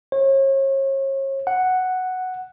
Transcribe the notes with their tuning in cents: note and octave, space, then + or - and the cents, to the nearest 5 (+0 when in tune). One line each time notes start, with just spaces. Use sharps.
C#5 -35
F#5 +0